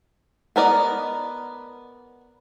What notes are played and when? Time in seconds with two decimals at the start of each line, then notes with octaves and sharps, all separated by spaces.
0.56 B3 A#4 D5 D#5